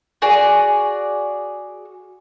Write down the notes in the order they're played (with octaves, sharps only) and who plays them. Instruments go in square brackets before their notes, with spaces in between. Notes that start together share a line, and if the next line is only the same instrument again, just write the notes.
[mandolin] F#4 G#4 D5